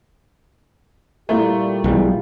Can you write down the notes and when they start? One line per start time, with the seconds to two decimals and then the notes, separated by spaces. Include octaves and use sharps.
1.29 A#2 G3 A3 A#3 E4 F4 G4
1.84 B1 E3 G3 G#3